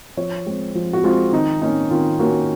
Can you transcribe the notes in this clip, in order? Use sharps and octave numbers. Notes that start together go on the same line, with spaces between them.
F3 C#5
G#3 C4
F3
F#4
G#3 C4 F4
D#3 D#4
A#3 C#4 D#4
D#3 F4
A#3 C#4 F#4